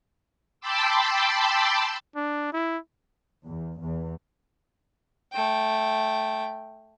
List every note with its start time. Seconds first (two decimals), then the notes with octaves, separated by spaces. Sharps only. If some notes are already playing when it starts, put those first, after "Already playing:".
0.60 G5 A5 B5 C6 D6 E6
2.16 D4
2.53 E4
3.45 E2
3.80 E2
5.33 A3 G5